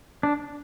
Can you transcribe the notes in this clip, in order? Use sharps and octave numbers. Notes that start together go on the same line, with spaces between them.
D4